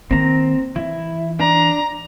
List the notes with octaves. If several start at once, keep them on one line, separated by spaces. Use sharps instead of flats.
D#3 A#3 C4 A#5
E3 E4
D4 A#5